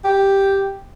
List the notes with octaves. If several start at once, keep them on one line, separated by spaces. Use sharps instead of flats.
G4